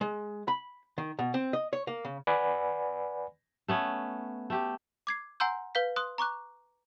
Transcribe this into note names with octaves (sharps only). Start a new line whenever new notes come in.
G#3
B5
D#3
B2
C4
D#5
C#5
A#3
C#3
B4 D5 F#5 G#5 B5
A3 B3 C#4
A3 G4
D6 G#6 C7
F#5 G#5 A#5 C6 E6 G6
B4 F5 G6 B6
C6 D#6 F#6
A#5 C#6 D6 F#6